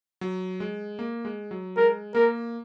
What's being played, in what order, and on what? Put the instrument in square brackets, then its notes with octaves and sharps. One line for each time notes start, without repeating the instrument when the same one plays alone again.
[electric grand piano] F#3
G#3
A#3
G#3
F#3
[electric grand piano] G#3 [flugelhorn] A#4
[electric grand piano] A#3 [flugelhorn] A#4